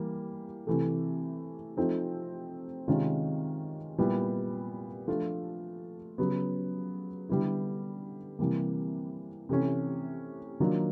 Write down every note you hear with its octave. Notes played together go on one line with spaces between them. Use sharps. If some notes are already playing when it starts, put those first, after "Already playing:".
Already playing: E3 G3 A#3
C3 E3 A3
F3 A3 C4 D#4
C3 D#3 G#3 C#4 F4
A#2 G3 B3 E4
F3 A3 D4 F4
C#3 F#3 B3
D3 G3 B3 E4
C3 E3 G3 A#3
C3 E3 A3 C#4
D#3 F#3 A#3 D4 F4